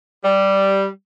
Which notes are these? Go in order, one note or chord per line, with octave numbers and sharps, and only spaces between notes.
G3